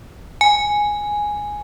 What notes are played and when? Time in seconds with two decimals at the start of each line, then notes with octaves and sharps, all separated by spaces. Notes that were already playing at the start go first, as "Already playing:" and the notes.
0.41 G#5